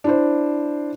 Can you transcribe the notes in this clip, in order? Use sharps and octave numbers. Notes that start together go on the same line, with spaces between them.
D4 E4 C5